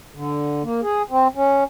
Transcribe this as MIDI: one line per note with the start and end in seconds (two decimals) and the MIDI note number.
0.14 0.63 50
0.63 0.81 58
0.82 1.02 68
1.10 1.28 60
1.35 1.64 61